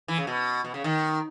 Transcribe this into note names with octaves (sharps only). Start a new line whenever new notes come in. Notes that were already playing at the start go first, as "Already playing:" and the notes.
E3
C#3
B2
B2
C#3
D#3